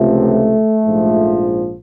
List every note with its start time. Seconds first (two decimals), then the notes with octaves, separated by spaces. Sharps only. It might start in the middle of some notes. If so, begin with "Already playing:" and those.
Already playing: C#2 C3 F3 A3
0.83 A#1 G#2 F3